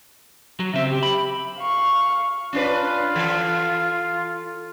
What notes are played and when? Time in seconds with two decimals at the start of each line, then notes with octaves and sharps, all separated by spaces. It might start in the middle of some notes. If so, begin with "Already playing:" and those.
0.60 F#3
0.74 C#3 C4 E5
0.89 G4
1.03 B5
1.59 F5 C#6
2.53 C#4 D4 F4 B4
3.15 E3 A4